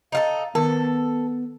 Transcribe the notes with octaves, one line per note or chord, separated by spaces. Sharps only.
D#4 F4 A4 F5
D#3 B3 A4